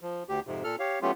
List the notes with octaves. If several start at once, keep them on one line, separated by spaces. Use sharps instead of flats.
F3
D2 G4
F2 G#2 C3
A#2 A4 F6
G4 C#5 F5
F#3 A3 B3 C#4 F4 G4